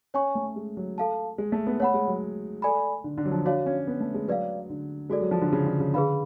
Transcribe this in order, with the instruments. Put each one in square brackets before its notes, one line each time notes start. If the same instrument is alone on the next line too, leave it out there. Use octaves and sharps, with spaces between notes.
[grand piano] C#4 [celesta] C#5 G#5 C#6
[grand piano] A3
G#3
F#3
[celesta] A4 F5 A5
[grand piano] G#3
A3
B3
[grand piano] A3 [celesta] C#5 F#5 B5
[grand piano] G#3
F#3
[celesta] A4 D5 G#5 B5
[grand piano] D3
D3
F#3
F3
[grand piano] D4 [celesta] F#4 C#5 F5
[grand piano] C#4
B3
A3
G#3
[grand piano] F#3 [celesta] B4 D5 F5
[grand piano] D3
[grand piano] G#3 [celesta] F#4 A4 D5
[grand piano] F#3
F3
D3
C#3
D3
C#3
[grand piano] D3 [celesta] G#4 B4 F5 B5